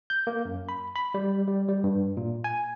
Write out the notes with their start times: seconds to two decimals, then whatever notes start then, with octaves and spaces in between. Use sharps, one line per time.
0.10 G6
0.27 A#3
0.45 F#2
0.69 B5
0.96 B5
1.14 G3
1.48 G3
1.69 G3
1.84 G2
2.17 A#2
2.44 G#5